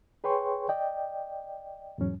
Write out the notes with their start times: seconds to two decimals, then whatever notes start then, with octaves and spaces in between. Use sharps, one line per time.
0.24 G#4 B4 C#5 G5 C6 C#6
0.69 D5 D#5 G5
1.98 E2 G#2 F#3 C#4